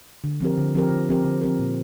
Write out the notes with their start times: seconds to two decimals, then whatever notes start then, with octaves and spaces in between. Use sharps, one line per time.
0.24 D3
0.41 F3 C4 G4 A#4
0.58 D3
0.75 F3 C4 G4 A#4
0.91 D3
1.09 F3 C4 G4 A#4
1.24 D3
1.42 F3 C4 G4 A#4
1.59 A#2